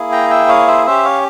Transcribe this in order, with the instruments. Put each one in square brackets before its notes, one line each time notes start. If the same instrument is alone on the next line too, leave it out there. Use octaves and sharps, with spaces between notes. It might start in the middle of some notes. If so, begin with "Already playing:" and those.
Already playing: [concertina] A#3 E4 G#4
G5 A#5
E5 G5
C#5 F5
C5 E5
C#4 G4 C5 E5
C#5 F5